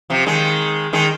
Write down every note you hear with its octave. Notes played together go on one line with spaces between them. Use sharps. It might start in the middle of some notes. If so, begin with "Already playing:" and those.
C3 F3
D#3 G#3
D#3 G#3